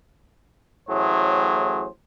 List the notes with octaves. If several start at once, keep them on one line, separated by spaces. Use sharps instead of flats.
A1 A2 F#3 G#4 C5